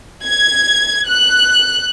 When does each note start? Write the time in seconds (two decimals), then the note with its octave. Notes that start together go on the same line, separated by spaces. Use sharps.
0.25 G#6
1.08 F#6